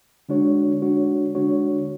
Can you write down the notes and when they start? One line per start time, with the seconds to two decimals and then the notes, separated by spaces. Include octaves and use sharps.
0.29 D3 G#3 D4 F#4 C#5
0.82 D3 G#3 D4 F#4 C#5
1.35 D3 G#3 D4 F#4 C#5